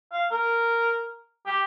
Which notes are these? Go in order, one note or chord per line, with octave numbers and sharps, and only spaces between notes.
F5
A#4
G4